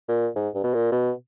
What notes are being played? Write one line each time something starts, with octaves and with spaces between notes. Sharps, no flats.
A#2
G#2
G2
B2
A#2
B2